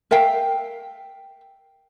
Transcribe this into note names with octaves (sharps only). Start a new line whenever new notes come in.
A#4 E5 F5 G5